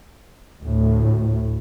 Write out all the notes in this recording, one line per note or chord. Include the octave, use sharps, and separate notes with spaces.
D2 A2